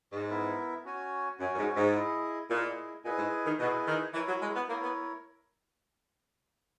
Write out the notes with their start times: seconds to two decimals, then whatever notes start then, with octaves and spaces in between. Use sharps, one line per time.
0.13 G#2
0.30 B3 E4 A#4 E5
0.85 C#4 F#4 C#5 G#5
1.40 F#2 C#4 F#4 C#5 G#5
1.55 F#2
1.58 G#2
1.76 G#2
1.95 E4 G#4 D#5
2.49 A#2 E4 G#4 D#5
3.04 A#2 E4 G#4 B4 D#5 G#5
3.18 G#2
3.46 D#3
3.59 B2 E4 G#4 B4 D#5 G#5
3.86 D#3
4.14 E3 E4 A#4 C#5
4.28 F#3
4.42 G#3
4.56 B3
4.69 A#3 E4 A#4 C#5
4.83 B3